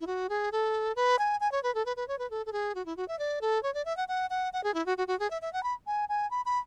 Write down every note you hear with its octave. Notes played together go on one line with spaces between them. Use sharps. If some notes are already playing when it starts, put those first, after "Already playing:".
E4
F#4
G#4
A4
B4
G#5
G#5
C#5
B4
A4
B4
B4
C#5
B4
A4
A4
G#4
F#4
E4
F#4
E5
D5
A4
C#5
D5
E5
F#5
F#5
F#5
F#5
G#4
E4
F#4
F#4
F#4
G#4
E5
E5
F#5
B5
G#5
G#5
B5
B5